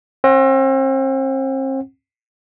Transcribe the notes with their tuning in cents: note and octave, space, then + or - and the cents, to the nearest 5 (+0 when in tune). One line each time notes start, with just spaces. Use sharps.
C4 +40 F#5 +0